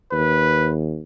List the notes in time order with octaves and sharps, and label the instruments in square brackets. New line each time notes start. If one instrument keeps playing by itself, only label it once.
[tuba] D#2 [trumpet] B4